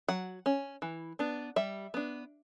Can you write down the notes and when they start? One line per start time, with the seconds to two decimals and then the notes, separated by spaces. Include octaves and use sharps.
0.08 F#3 F#5
0.46 C#4
0.82 E3
1.19 B3 D4
1.56 G3 E5
1.94 B3 D4